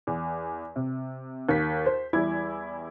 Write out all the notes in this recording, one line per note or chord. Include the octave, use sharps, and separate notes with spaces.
E2
C3
D#2 B6
C5
E2 G3 E4 G#6